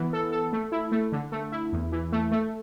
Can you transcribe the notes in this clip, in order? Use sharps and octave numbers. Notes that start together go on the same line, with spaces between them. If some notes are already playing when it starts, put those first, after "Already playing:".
Already playing: E3 B3
A4
A4
A3
E4
A3
D3
A3
E4
E2
E3
A3
A3